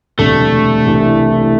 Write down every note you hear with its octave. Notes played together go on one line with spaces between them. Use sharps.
E1 D2 C3 G3 A3 D4
C2 C3 E3 G3 D4